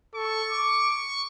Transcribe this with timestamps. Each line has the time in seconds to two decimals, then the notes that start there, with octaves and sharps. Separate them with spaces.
0.15 A4 C#6
0.50 D6
0.90 C#6